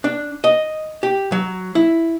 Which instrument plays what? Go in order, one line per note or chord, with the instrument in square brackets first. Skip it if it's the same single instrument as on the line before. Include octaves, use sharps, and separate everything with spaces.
[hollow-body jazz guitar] D4
D#5
G4
F#3
E4